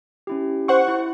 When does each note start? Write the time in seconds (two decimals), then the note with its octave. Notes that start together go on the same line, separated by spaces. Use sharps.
0.27 C#4 E4 G4
0.68 C5 F#5 C#6
0.88 E4